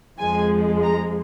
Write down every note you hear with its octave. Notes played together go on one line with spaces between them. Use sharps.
F2 F3 G#3 G#5
A#5